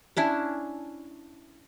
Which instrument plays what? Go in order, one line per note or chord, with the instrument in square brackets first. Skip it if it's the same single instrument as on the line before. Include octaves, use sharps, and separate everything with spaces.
[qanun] C#4 D4 E4